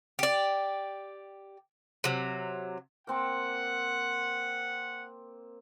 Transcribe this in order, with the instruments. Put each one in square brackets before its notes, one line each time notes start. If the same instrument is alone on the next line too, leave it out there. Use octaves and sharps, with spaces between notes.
[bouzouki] G4 D5
C3 F#3
[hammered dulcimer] A#3 C4 D6 [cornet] F#5